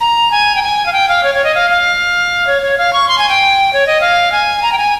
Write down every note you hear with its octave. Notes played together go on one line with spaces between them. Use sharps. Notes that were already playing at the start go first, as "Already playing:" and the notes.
A#5
G#5
G5
G#5
F5
G5
F5
C#5
C#5
D#5
F5
F5
C#5
C#5
F5
C#6
C6
G#5
G5
C#5
D#5
F5
G#5
A#5
G5
G#5